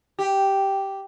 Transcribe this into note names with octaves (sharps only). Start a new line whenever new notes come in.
G4